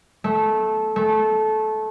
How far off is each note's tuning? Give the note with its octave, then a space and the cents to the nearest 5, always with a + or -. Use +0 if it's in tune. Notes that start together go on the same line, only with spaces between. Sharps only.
A3 -15
A3 -20